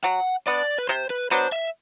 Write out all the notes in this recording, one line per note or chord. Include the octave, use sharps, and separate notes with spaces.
F#3 F#5
B3 D4 D5
B4
C3 C5
B4
F#3 B3 D4 C5
E5